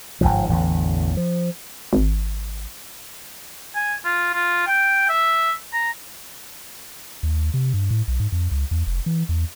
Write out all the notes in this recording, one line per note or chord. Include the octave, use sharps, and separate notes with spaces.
G1 C2 G#2 F3
A1 E2 D3
F3
G#1
G#5
F4
F4
G5
E5
A#5
D#2
C3
G2
A2
B1
G#2
F2
C#2
E2
F1
E3
E2